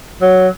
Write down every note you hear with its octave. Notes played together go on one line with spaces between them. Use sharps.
F#3